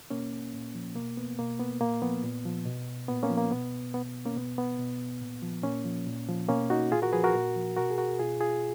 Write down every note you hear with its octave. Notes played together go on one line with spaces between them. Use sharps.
B2 A#3 C#4
A#2
F3
B2 A#3
B3
B2 A#3
B3
A#2 A#3
F3 B3
A#2
F3
B2
A#2 B3
A#3 C#4
F3
A#3
B2 B3
B2 B3
A#3 C#4
B2 B3
B3
B2
A#2
F3
A#2 A#3 C#4
F3
A#2
F3
B2 A#3 C#4
D#4 F#4
A#2 F4 G#4
F#4 A#4
F3 G#4 B4
F#4 A#4
A#2
F3
B2 F#4 A#4
G#4
F#4 A#4
B2 F4 G#4
F4 G#4